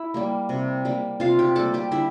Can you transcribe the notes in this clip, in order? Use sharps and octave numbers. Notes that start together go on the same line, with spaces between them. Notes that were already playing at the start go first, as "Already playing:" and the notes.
Already playing: E4 E5
G3 A#3
C3
G3 A#3
C3 F4 F5
G4 G5
G3 A#3 A4 A5
G4 G5
D3 E4 E5